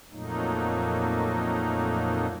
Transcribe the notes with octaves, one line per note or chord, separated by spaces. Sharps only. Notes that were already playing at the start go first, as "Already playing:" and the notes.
F2 A#2 F#3 A3 A#3 D#4